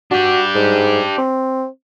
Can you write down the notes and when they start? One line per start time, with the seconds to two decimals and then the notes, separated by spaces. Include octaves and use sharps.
0.11 D4 F#4 G4
0.55 G#2
1.18 C4